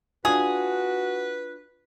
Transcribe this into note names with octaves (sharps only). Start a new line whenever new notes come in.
D4 F4 F#4 G#4 B4